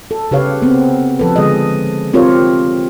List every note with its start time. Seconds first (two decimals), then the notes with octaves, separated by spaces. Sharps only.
0.11 A4
0.31 C#3 G4 B4 C#5 F5
0.62 B3 C4
1.19 F3 A4 B4
1.36 D3 G#3 G#4 D#5
2.14 C4 F4 G4 A#4 C#5